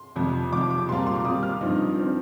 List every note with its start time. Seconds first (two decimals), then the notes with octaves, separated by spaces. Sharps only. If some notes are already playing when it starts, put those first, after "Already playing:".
Already playing: C6
0.16 F2 C3 F3
0.53 F2 C3 F3 D6
0.71 D6
0.89 A#2 G3 C4 F4 C6
0.98 A#5
1.07 C6
1.15 D6
1.25 A#2 G3 C4 F4 D#6
1.43 F6
1.61 G2 F3 C4 D#4
1.98 F3 C4 D#4